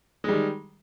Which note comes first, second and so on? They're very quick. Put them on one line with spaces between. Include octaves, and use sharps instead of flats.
G#3 G3 D#3